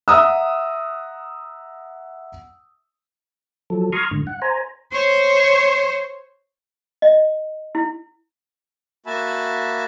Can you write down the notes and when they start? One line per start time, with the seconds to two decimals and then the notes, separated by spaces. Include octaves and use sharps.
0.08 E5 F#5 A#5 D#6 E6
3.70 F3 F#3 A4
3.92 A#5 C6 C#6 D#6 F6 G#6
4.11 G#2 D3
4.27 F#5
4.42 C5 G#5 A#5
4.92 C5 C#5
7.02 D#5
7.75 E4
9.06 A#3 F#4 E5 G#5 A5 B5